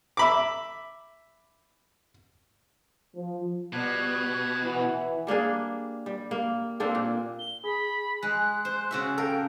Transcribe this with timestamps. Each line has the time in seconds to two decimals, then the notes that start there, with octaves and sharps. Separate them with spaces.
0.17 E5 B5 D6
3.14 F3
3.73 B2 F3 G3 F#6 G#6
4.62 E3 F#5 G#5 B5
5.27 G3 A#3 D4 G#4
6.06 G3
6.31 A#3
6.80 A#3 C4 D4 A4
6.95 A#2
7.39 G7
7.64 G#4 B5
8.23 G#3 F#6
8.65 C5
8.91 C#3 F#4 E5
9.18 A4 A#4 F5 G5